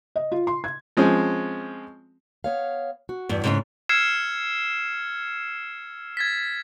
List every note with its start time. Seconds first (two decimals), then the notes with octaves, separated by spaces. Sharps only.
0.16 D#5
0.32 F4
0.47 C6
0.64 G#6
0.97 F3 G#3 C4 C#4
2.44 B3 C#5 F5
3.09 F#4
3.29 E2 G2
3.44 G#2 C#3 G#3
3.89 E6 F6 G#6 C7 C#7 E7
6.17 G#6 A6 B6